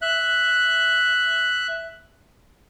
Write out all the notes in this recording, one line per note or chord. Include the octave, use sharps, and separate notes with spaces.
E5 F#6